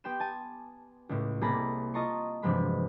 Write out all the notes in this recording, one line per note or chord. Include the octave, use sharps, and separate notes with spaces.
B3 G4 G5 C6 E7
G#5 A5 D#7
C#2 A2
C2 A#3 G#4 A5 B5 A#6
F4 D#5 A5 A#5 C6 C#6
E1 G2 C3 F3 G#3 B5